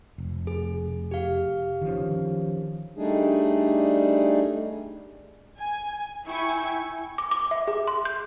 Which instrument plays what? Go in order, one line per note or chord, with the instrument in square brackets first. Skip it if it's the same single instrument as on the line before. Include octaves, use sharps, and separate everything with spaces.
[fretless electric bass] F1
[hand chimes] G#4
G4 F5
[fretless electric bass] D#3 F3 C#4
[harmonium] G3 A3 D4 D#4 G#4
[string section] G#5
E4 G5 G#5 C#6
[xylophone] D6
D6
E5
G#4
C6
G6